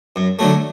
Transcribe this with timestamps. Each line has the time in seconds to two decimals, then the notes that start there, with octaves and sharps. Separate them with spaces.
0.16 F#2
0.39 D3 F#3 A3